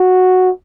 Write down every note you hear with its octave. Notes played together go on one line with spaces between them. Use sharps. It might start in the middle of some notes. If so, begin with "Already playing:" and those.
Already playing: F#4